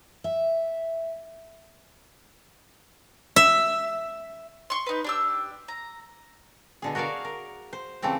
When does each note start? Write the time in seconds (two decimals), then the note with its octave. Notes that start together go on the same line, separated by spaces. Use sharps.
0.24 E5
3.36 E5
4.70 C6 C#6
4.86 D#4 B4
5.04 D4 G4 E6
5.68 A#5
6.82 B2 D3 G#4
6.95 F#4 A#4 C#5 D5 F5
7.25 A#4
7.73 C5
8.02 C#3 E3 A3 C4 G4